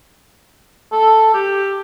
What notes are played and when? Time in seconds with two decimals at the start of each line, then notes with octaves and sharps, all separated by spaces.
0.92 A4
1.34 G4